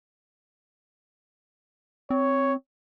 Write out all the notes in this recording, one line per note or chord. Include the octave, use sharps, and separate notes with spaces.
C4 C#5